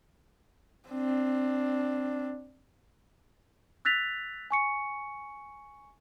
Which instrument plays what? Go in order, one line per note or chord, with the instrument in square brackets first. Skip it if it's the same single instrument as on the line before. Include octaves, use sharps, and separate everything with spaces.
[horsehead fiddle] C4 D4
[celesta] E6 F#6 A6 B6 F7
G#5 C#6 C#7